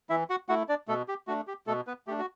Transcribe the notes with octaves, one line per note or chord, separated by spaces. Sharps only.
E3 E4 E5
F#4 F#5
A3 E4 F#4 F#5
D4 D5
B2 A3 A4
G4
A3 D4 F#4
G4
B2 A3 A4
B3 B4
A3 D4 G4
F#4